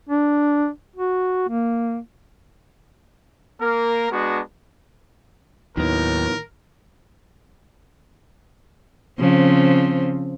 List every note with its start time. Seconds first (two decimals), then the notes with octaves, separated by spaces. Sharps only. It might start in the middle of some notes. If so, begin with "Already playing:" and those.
0.09 D4
0.96 F#4
1.49 A#3
3.60 A#3 A#4
4.11 G#3 B3 D4 F#4
5.77 D#2 A2 D#3 F#3 B3 A#4
9.20 C#3 F3 C4